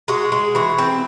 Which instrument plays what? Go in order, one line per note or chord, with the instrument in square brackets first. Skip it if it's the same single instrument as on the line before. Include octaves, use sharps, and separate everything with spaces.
[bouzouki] G#3 F#4
G#3
E3 F#4
C4